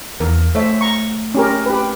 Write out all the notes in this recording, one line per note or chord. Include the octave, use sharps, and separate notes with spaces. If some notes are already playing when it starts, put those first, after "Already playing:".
E2 A#4
A3 C5 C#5 E5
A#5 C#6
C#4 G4 A#4
G4 B4